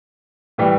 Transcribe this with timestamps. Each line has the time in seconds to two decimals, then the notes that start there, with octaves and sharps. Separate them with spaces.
0.58 A2 E3 G3